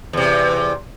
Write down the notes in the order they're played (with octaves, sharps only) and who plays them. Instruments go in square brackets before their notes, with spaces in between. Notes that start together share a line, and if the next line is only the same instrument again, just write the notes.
[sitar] E2 C3